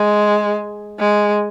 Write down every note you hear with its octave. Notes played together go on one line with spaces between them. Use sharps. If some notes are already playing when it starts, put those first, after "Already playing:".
Already playing: G#3
G#3